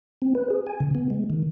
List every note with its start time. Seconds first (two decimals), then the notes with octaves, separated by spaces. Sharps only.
0.22 C4
0.35 B4
0.50 G#4
0.67 G#5
0.80 C#3
0.95 B3
1.10 G#3
1.30 D#3